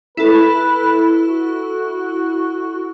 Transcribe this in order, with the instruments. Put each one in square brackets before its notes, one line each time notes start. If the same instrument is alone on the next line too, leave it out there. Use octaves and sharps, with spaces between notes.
[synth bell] E4 A4 [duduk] B4
[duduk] F#4